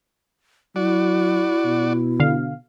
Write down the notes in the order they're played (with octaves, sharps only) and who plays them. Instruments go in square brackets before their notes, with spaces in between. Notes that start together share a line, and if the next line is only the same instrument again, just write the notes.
[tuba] F#3 [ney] E4 [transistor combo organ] F#4 D5
[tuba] B2
[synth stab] D3 F5